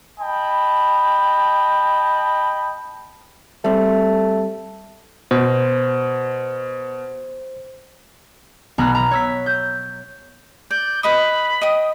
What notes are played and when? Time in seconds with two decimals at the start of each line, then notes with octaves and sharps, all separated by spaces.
0.20 D#5 G5 A5 B5
3.64 G3 A3 C4
5.31 B2 C5
8.78 B1 B3 A#5 B5 F6 F#6
8.95 A#5
9.11 C#5 E6 B6
9.46 G6
10.71 D5 G6
11.03 B4 D#5 B5 D#6
11.61 D#5 G5 D#6